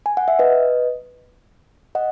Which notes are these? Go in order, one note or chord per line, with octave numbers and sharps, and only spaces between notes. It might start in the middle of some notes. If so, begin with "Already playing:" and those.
G#5
F#5
E5
B4 D#5
D#5 F#5